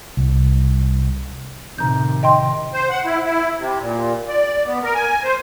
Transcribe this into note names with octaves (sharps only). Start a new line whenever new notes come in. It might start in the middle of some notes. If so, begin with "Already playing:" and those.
C2
A2 C3 D#3 A#5 G6
D#5 G5 C6
C5
F#5
E4
E4
C3
A#2
D5
B3
A#4
G#5
C5